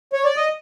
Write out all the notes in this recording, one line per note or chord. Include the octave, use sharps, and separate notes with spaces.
C#5
D5
D#5